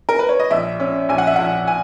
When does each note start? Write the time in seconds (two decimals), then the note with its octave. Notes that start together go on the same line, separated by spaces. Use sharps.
0.09 A#4
0.19 B4
0.29 C#5
0.40 D#5
0.51 A#1 E5
0.80 C#4
1.09 A#1 G#5
1.18 F#5
1.27 E5
1.36 A#1 F#5
1.67 G#5